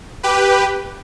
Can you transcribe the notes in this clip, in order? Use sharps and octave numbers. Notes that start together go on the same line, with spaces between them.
G4 B4